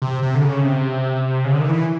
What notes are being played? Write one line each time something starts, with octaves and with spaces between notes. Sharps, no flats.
C3
C3
D3
C#3
C3
C#3
D3
D#3
E3